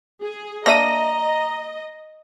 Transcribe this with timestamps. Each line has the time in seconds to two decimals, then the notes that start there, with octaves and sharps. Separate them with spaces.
0.22 G#4
0.66 A#3 D4 D#5 E5 A#5 A#6 D#7